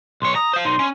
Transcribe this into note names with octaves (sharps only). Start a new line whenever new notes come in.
B1 C#5 C6
A#5 D#6
C5 F5
B1 D#4 C6
C#4